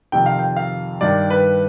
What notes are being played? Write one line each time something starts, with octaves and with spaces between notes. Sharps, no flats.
F2 C3 D#3 G5
F5
G5
F5
G2 D#3 D5
B4